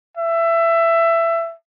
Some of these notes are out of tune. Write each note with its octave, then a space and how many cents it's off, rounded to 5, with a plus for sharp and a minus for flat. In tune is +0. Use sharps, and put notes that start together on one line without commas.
E5 +20